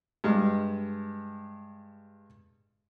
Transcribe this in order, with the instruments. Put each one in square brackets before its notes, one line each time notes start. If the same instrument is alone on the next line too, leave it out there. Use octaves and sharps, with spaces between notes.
[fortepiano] G2 G#3